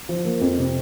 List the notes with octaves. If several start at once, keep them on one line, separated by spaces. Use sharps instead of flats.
F3
A#3
F2
C3